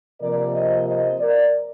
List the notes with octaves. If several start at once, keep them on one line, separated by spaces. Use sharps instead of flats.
C3 F3 A#3 A#4 D5
C5 D#5
C5 D#5
A#4 D5